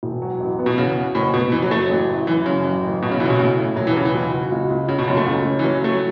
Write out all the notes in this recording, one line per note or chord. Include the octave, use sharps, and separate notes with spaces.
E1
F#3
A1
B3
B2
E2 C#3
F#4
F#1 A2
B2 B3
F#1 E3
F#3
F#1 A3
F#3
A1
E4
F#2 E3
F#2 C#3
A1
A1
B1 B2
C#3
B1 E3
C#3
B2
A2 C#3
E4
E1 F#3
E3
C#3 F#3
E3
C#2
F#4
C#2
C#2
C#2 C#3
B2
F#2 C#4
A3
C#2
C#4
E3
A2 F#3
A2 A3
F#3